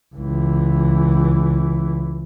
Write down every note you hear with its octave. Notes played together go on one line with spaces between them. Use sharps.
C#2 E3